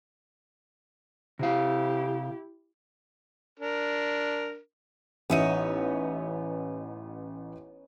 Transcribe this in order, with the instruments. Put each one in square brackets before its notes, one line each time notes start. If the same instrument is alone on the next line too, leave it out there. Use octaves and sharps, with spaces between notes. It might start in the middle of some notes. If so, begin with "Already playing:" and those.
[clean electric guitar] C3 F5 [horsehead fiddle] E4 G4
[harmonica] D4 A#4
[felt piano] A1 E5 D#7 [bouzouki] B3 C#4 D#4